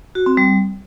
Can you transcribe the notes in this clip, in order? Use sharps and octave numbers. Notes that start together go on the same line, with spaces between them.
F#4
C4
G3